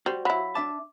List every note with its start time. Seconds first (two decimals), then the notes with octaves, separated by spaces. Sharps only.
0.06 G3 F#4 C5
0.25 F#3 E4 F5 B5 B6
0.55 D4 E5 A5 D6